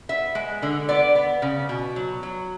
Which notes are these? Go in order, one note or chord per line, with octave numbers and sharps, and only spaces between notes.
B3 E5
G#3
D3
B3 D5
B3
C#3
B2
F#3
F#3